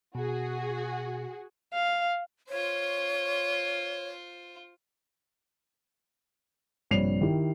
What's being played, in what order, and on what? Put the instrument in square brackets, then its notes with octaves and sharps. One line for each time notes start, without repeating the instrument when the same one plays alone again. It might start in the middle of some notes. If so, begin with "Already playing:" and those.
[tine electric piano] B2 [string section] F#4 G#4
[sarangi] F5
[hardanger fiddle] F4 C5 [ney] C#5
[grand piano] A#1 G2 C3 C#5 C7 F7
D#3 E4 G4